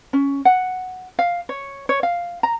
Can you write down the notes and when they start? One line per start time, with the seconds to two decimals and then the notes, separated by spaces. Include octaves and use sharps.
0.13 C#4
0.45 F#5
1.19 F5
1.49 C#5
1.89 C#5
2.03 F5
2.43 A#5